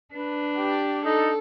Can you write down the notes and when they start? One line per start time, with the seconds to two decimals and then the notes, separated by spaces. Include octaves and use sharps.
0.15 D4 B4
0.58 G4
1.06 D#4 A4